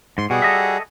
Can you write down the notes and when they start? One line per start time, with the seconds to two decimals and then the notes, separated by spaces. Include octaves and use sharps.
0.18 G#2 C6
0.30 B2 G3 F#4 G#4
0.42 A4 D#5 E5